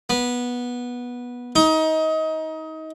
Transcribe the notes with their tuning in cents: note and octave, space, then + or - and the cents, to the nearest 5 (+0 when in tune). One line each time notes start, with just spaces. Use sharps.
B3 -15
D#4 +25